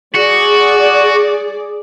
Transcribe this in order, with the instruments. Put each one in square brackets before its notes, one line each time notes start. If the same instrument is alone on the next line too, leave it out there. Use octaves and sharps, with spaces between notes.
[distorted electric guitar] F#4 [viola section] G#4 D5